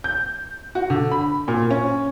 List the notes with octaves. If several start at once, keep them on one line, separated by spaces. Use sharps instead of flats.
G6
F#4
D3
B5
A#2
C#4